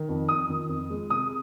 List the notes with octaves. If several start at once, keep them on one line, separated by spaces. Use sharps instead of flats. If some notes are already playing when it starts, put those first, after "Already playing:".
Already playing: D#3
F2
F2 D#6
D#3
F2
G#3
C3 D#6